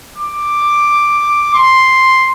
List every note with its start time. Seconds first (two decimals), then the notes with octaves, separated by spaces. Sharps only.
0.17 D6
1.54 C6